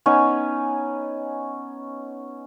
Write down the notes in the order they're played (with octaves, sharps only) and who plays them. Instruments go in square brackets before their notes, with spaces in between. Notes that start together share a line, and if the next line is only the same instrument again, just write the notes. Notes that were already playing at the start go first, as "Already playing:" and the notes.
[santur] B3 C#4 D#4 G#5